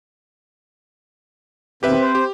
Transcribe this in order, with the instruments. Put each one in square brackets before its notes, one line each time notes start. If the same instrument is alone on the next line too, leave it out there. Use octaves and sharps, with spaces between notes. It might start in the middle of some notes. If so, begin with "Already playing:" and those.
[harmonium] E2 B2 D#3 [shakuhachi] C4 [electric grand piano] G4 B4 E5
[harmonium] C5
[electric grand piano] G4